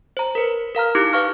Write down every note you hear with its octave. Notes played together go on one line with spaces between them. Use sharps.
C5 A#5
A#4 B4
A#4 F5 A#5 F6
D#4 E4 G4 D6
B4 F5 C#6 F6